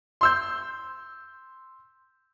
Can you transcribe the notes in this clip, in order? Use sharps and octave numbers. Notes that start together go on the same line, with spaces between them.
C6 E6 G6